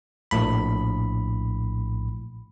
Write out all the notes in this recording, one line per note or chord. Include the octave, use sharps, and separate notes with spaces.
A#1 A2 B5